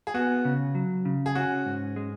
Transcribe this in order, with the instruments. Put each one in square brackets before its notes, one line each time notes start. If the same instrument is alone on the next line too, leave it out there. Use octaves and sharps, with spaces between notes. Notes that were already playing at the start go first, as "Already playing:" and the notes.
[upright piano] G#4
[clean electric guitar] B3 [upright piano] F#4
[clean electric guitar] C#3
F#3
C#3
[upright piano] G#4
[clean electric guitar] C#4 [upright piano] F#4
[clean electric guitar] G#2
G#3